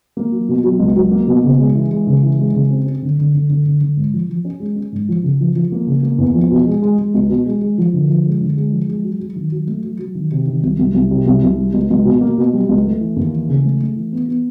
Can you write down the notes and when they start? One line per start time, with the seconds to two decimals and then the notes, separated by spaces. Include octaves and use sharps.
0.17 A#3
0.32 F#3
0.49 B2
0.64 F#3
0.79 C#2
0.96 F#3
1.11 A#3
1.27 B2
1.44 C#3
1.59 G#3
1.75 E3
1.91 G#3
2.07 C#3
2.23 E3
2.39 G#3
2.54 C#3
2.71 C4
2.86 C4
3.02 D3
3.18 D3
3.34 D3
3.49 D3
3.65 D3
3.81 D3
3.97 G#2
4.13 F3
4.29 F3
4.45 C#4
4.60 G#3
4.76 C#4
4.92 G#2
5.09 F3
5.23 C#3
5.40 F3
5.55 F3
5.72 A#3
5.87 C#3
6.03 A#3
6.18 E2
6.35 F3
6.51 B2
6.67 G#3
6.82 G#3
6.98 G#3
7.14 C#2
7.29 B2
7.46 G#3
7.62 G#3
7.78 F3
7.94 D3
8.10 F3
8.26 G#3
8.41 D3
8.57 G#3
8.72 F3
8.89 G#3
9.04 F#3
9.20 F#3
9.36 D#3
9.52 F#3
9.67 A3
9.84 F#3
9.99 F#3
10.15 D#3
10.32 C3
10.47 D#3
10.63 C2
10.79 C2
10.94 C2
11.11 C3
11.26 C2
11.42 C2
11.58 G3
11.74 C#2
11.90 C#2
12.05 B2
12.21 A#3
12.38 B2
12.53 G3
12.69 C#2
12.85 A3
13.00 E3
13.17 D#2
13.33 E3
13.49 C#3
13.64 A3
13.81 A3
13.96 E3
14.12 B3
14.28 B3